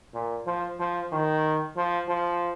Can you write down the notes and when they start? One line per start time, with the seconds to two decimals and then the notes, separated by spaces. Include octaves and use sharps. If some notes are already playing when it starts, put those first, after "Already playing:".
0.14 A#2
0.47 F3
0.80 F3
1.12 D#3
1.77 F3
2.08 F3